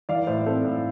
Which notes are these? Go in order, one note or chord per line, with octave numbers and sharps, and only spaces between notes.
E3 D5 F5
A2 C5 E5
C4 A4 C5
A2